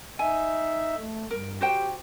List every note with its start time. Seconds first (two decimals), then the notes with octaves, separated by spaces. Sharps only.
0.19 D#4 E5 G#5
0.97 A3
1.31 G2 A#4
1.61 F#4 G4 C5 G5